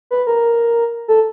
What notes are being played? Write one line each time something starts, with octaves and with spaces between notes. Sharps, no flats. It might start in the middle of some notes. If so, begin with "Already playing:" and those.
B4
A#4
A4